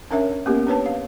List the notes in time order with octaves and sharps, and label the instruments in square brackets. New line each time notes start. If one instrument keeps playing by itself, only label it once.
[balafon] C#4 D4 A#4 C#5 E5
A#3 B3 C#4 G4 A#4
D4 B4 C#5 A5
F5